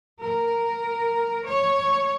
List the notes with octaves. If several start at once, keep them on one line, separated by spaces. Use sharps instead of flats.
A#4
C#5